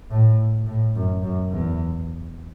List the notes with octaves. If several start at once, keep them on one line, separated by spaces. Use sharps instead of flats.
A2
A2
F#2
F#2
E2